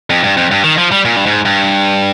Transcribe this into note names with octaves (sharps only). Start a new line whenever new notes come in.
F2
G2
F2
G2
D#3
F3
G3
A#2
G2
G#2
G2